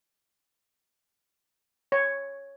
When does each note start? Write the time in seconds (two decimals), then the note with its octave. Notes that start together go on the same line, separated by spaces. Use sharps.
1.92 C#5